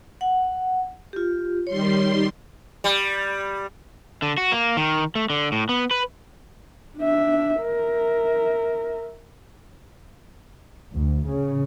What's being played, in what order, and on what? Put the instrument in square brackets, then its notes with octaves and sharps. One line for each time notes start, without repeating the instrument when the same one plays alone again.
[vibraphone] F#5
F4 G4
[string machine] D#3 G3 C6 [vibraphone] C#5
[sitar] G3
[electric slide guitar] D3
F#4
A#3
D#3
A3
D3
A2
B3
B4
[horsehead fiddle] D4 E5
A#4 E5
[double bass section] D2
C#3